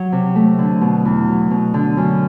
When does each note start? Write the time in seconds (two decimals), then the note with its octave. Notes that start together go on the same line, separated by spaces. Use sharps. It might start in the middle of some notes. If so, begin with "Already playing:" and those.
Already playing: F#3
0.12 C3
0.35 A3
0.59 D3
0.81 B2
1.05 E2
1.28 F#3
1.51 B2
1.74 D3
1.97 F#2